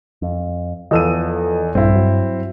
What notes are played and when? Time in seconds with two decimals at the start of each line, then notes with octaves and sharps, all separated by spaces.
0.22 F2
0.91 E2 E3 F3 A4 D#5 E6 D#7
1.75 A#1 G2 C4 E4
1.95 F#3